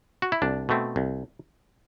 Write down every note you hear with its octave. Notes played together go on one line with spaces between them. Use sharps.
F#4
E4
C2 D4
B2 A3 C4
C2